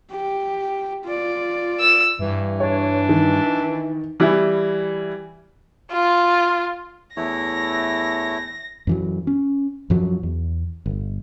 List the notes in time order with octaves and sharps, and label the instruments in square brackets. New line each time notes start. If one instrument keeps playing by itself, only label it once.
[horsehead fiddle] G4
F4 D5
[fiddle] E6
[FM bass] G2 [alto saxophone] E3
[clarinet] D4 [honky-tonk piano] C#5
[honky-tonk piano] D#3
[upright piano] E3 G3 E4
[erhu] F4
[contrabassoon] E2 [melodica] A3 E4 C#5 [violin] A#6
[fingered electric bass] F#2 E3 F#3
C#4
F#2 F3 F#3
E2
G1